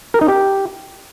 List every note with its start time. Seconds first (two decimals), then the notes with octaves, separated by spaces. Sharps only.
0.14 A#4
0.21 D#4
0.28 G4